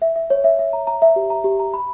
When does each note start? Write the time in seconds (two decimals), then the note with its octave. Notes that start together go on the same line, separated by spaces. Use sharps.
0.02 E5
0.16 E5
0.30 C#5
0.44 E5
0.59 E5
0.73 A#5
0.87 A#5
1.02 E5
1.16 G4
1.30 A#5
1.44 G4
1.60 A#5
1.74 B5